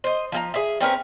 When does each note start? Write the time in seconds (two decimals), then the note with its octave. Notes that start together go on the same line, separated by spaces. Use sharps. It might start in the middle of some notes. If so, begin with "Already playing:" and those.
0.04 C5 D#5
0.32 F3 E5 A#5
0.54 G#4 E5
0.80 C4 C#4 A#4 B4